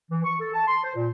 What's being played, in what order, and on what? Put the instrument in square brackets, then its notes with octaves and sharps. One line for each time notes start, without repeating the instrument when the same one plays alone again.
[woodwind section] E3
C#6
A4
A5
C6
C5
A#2